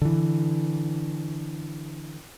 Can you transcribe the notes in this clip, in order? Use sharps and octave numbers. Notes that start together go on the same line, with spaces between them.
D3 E3